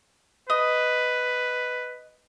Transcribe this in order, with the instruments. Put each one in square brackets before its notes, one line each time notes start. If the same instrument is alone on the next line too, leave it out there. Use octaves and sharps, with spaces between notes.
[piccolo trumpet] B4 [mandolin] D#5